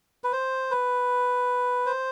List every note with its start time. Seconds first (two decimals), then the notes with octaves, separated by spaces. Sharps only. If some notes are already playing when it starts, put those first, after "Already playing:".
0.24 B4
0.33 C5
0.71 B4
1.86 C5